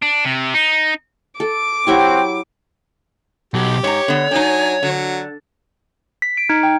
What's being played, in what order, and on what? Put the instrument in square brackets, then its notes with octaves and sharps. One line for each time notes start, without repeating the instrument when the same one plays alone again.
[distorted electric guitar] D4
C3
D#4
[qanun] A4 [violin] D6
[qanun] F#3 E4 G4 [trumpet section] C4 F#4 G5
[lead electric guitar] B2 F#3 [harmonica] G4
[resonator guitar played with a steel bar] G#2 A#5 [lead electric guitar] C#5
[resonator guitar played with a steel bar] D3 B3
[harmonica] F#3 G#5 [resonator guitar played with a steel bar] D4 D#4
[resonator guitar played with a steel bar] D3 [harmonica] F#3
[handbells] B6
D7
D#4
G5